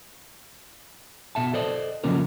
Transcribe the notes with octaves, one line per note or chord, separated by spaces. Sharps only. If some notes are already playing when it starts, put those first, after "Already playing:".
B2 E5 A5
A4 C5 D5 D#5
C#3 F3 F#3 A#3 C#4 A#4